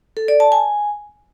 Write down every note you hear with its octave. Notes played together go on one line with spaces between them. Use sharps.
A4
D5
A5
G#5